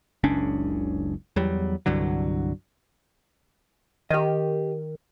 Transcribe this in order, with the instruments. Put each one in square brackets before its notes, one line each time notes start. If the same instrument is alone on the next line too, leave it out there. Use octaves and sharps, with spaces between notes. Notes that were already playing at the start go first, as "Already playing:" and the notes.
[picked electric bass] F#1 C#2 C#4 D4
E2 F#3 G3
C2 G2 D3 F#3
[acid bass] D#3 [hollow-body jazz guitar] G4 D#5